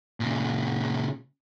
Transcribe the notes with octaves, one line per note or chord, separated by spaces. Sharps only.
A#2 C#3